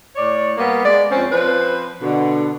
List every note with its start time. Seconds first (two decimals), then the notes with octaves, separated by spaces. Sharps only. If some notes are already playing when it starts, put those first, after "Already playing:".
0.16 A2 C#5 D5
0.58 G3 A#3 B3
0.85 G#3 D5
1.11 F2 C4 C#4
1.31 F3 C4 B4
2.02 B2 D3